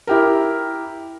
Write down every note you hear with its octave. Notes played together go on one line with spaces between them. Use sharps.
E4 G4 A#4